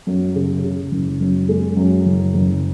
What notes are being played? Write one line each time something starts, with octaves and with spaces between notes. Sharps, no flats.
F#2
C#3
C#3
F#1
F#2
G#3
F#2
F#1
F#1